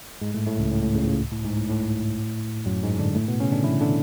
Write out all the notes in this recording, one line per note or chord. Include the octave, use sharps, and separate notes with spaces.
G#2 G#3
A2 A3
A2 A3
C#2 C#3
A2
A2
C#2 C#3
C#2 C#3
A2
G#2
A2
A2
F#2 F#3
G#2 G#3
D3 D4
A2 A3
B2 B3
C#3 C#4
D3 D4
E3 E4
D3 D4